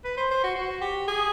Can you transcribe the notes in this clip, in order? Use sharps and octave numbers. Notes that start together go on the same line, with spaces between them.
B4
C5
C5
F#4
F#4
G4
G#4